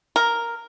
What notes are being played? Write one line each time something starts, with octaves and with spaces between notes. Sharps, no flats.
A#4